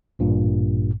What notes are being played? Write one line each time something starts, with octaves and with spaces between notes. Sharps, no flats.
A1 G2 A#2